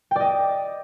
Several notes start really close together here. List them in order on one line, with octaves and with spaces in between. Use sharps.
G5 D5 D#5